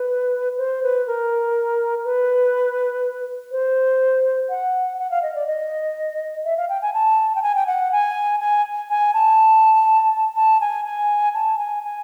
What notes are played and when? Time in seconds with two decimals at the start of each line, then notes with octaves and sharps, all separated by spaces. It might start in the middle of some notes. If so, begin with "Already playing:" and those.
Already playing: B4
0.58 C5
0.83 B4
1.07 A#4
2.05 B4
3.52 C5
4.49 F#5
4.98 F#5
5.11 F5
5.23 D#5
5.35 D5
5.47 D#5
6.45 E5
6.57 F5
6.69 G5
6.82 G#5
6.94 A5
7.35 G5
7.43 G#5
7.55 G5
7.67 F#5
7.92 G#5
8.40 G#5
8.90 G#5
9.14 A5
10.36 A5
10.61 G#5
10.85 G#5
11.34 A5
11.58 G#5
11.83 G#5